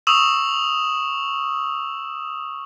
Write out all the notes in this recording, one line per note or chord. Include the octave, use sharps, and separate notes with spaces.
C#6 D#6 E6 E7 F#7